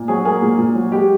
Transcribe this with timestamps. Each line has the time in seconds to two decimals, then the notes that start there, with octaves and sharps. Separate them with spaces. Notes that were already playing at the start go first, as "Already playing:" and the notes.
Already playing: A#2
0.08 F#3 G#4
0.25 A#3 G#4
0.42 A#2
0.58 A#2
0.75 F#3
0.92 G#3 G4